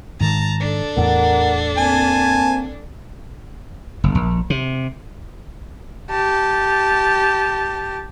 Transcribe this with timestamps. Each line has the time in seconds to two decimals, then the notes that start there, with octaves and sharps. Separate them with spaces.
0.20 G#2 D#3 A5 A#5
0.61 D4 A4
0.97 E2 A2 A#4 F#5
1.77 A#3 C4 G#5 A5
4.04 F#1
4.15 A#1
4.50 C3
6.11 G4 A5